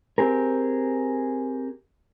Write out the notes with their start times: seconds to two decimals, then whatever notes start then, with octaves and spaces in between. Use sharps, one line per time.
0.18 C4 G4 G#4 A#4